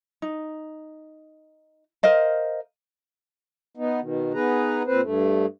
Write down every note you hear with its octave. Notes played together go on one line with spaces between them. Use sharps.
D#4
A#4 C5 D#5 F5
B3 D#4
B2 D#3
B3 D#4 G#4 B4 A#5
A#2 C4 B4 C5
G2 A3